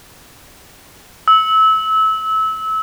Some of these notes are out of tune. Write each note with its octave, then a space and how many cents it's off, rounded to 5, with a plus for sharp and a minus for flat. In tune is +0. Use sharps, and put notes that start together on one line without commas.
E6 -25